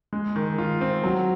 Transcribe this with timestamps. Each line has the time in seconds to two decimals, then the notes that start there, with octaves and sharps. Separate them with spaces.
0.13 G#3
0.36 D#3
0.58 F4
0.81 C4
1.04 F#3